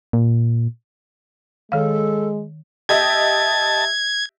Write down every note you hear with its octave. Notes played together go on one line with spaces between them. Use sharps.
A#2
D#3 G#3 A4 F5
G4 D#5 E5 A5 G#6